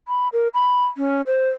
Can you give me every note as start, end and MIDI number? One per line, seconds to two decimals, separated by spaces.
0.08 0.28 83
0.33 0.48 70
0.54 0.86 83
0.97 1.21 61
1.27 1.49 72